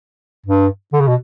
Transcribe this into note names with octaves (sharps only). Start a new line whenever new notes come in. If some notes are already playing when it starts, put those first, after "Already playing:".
G2
D3
C#3
B2